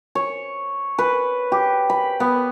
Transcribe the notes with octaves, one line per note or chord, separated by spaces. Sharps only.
C#5
B4
G4
B5
B3